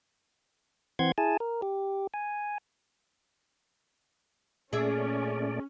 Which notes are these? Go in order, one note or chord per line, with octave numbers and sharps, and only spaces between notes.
E3 C4 F#5 C6 G#6
E4 G#4 G#5 A5
A#4
G4
G#5
A#2 A3 C#4 G#4 D5 E5